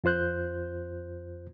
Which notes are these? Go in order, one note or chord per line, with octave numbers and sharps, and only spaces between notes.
F2 F4 C5 F#6 G6